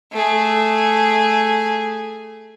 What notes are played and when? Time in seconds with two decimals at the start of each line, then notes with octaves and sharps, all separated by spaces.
0.12 A3 G#4